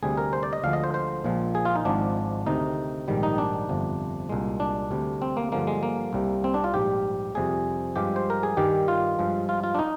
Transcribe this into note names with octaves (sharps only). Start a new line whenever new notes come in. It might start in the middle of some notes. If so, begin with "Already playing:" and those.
D2 C3 G3 G#4
A#4
C5
D5
D#5
D2 D3 F3 G#3 F5
D#5
C5
C5
A#1 A#2 F3 G#3
G#4
F4
D#4
G#1 G#2 F3 G#3 D4
D2 C3 D#3 D#4
A#1 G#2 D#3 G3
D#4
D4
G1 F2 C3
C2 A#2 G#3
D4
D2 C3 G3
C4
A#3
G2 D3 F3 G#3 A#3
G#3
A#3
C2 C3 G3
C4
D4
F4
A#1 G#2 G3 G4
F2 C3 G3 G#4
G2 F3 G#3 G4
C5
A#4
G#4
G2 D#3 G3 G4
F4
G2 F3 G#3
F4
F4
D4
D#4